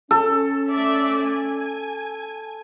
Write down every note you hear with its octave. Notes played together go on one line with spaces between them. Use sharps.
C#4 A4
A3 D5 E5
G#5